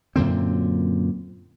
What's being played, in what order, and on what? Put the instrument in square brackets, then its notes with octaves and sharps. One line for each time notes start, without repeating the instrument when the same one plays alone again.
[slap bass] F#2 A#2 D3 C4